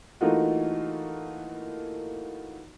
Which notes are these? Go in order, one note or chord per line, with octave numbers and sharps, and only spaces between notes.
E3 A3 A#3 D#4 F4 F#4